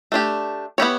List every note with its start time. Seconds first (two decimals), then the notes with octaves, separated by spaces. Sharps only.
0.12 A3 D4 G4
0.78 B3 E4 G4 C#5